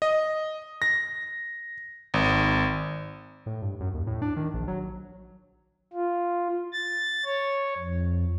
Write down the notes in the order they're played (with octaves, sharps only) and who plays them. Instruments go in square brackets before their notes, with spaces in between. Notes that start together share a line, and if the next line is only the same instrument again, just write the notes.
[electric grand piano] D#5
A#6
G#1
[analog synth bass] A2
G2
F#2
D#2
A2
D4
D#3
A#1
F#3
[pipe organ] F4
A6
C#5
F2